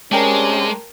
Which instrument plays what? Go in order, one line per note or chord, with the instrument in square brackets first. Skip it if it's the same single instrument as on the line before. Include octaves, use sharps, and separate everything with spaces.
[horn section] C3 G3 D4 [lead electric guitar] G#3 [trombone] C#4 [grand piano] A#4 G5 A5